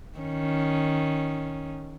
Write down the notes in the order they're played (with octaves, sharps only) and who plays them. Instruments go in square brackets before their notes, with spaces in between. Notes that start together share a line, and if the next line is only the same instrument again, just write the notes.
[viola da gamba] D#3 C#4